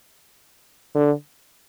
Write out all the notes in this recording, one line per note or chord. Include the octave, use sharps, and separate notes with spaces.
D3